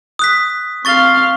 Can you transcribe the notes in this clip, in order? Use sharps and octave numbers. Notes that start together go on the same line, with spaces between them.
D#6 F#6 B6
C4 F5 C#6 A6 G7